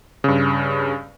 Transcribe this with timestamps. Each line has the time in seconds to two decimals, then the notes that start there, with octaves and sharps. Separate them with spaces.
0.24 G2 C#3